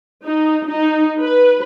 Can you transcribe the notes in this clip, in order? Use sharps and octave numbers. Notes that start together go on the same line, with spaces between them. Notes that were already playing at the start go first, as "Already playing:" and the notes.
D#4
D#4
B4